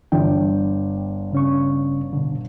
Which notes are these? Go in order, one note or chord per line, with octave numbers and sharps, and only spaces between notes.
G1 D4 G5
C#3 C#4 C#6
B2 D3